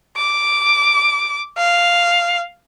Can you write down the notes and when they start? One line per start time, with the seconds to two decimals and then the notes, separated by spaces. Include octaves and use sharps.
0.17 D6
1.57 F5